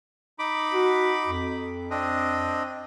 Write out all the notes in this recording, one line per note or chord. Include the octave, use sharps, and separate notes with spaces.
D#4 B5 D6
F#4
F2
C4 D4 D#5